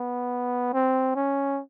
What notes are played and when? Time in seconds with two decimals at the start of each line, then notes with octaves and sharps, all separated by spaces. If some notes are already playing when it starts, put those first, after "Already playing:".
Already playing: B3
0.73 C4
1.16 C#4